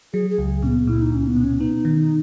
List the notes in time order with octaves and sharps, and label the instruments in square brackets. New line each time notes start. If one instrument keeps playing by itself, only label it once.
[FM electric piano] F#3 [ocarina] G#4
[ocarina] G#4
[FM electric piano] C#2
[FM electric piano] A#2 [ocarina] C#4
[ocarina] B3
[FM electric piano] A#2 [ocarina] E4
[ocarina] D#4
[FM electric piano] C#2 [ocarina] C#4
[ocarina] B3
[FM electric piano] B2
[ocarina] C#4
[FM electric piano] B3 [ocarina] D#4
[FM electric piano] D#3